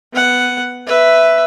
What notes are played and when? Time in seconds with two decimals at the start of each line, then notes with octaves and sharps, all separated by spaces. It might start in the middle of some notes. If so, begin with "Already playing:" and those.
0.13 B3 F#5
0.87 B4 E5